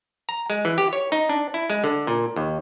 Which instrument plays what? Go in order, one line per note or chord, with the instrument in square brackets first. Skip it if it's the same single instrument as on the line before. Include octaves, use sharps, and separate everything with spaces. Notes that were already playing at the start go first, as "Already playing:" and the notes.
[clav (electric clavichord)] A#5
G#3
E3
G4
C#5
D#4
D4
E4
G#3
D3
A#2
D#2